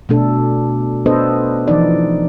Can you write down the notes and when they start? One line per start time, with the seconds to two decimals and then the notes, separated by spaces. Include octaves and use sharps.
0.09 B2 A3 D4 A4
1.06 B3 D4 A4 B4 C5 D#5
1.68 E3 F3 D#4 D5